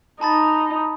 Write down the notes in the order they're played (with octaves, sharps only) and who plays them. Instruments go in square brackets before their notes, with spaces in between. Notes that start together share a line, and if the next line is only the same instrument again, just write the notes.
[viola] D#4 [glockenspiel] A5 B5 A6